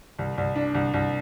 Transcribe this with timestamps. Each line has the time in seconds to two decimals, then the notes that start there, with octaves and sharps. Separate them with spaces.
0.19 C2
0.38 C2
0.56 D4
0.75 C2
0.94 C2